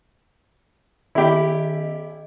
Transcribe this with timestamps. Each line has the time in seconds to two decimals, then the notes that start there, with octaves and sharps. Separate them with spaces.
1.15 D#3 B3 E4 G4 D#5